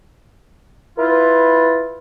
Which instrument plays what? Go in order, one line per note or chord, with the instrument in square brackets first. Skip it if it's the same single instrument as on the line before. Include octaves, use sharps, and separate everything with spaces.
[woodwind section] E4 F4 [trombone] B4